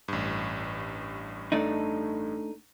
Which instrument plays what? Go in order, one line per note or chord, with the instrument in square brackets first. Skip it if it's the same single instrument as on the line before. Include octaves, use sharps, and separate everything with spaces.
[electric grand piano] A1 G2
[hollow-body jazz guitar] A3 D4 D#4